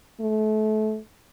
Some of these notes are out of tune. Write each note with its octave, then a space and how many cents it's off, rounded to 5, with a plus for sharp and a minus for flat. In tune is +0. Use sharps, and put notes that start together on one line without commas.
A3 -30